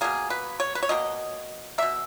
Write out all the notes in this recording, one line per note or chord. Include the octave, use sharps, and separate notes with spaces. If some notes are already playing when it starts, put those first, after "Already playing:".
B2 A#3 G#4
B4
C#5
B4
C#5
B2 A#3 D#5
B2 A#3 E5